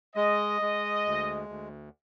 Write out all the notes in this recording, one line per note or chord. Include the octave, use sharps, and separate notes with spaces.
G#3 D#5
G#3
D2
D2